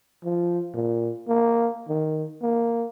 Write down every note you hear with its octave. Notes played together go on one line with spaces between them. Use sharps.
F3
A#2
A#3
D#3
A#3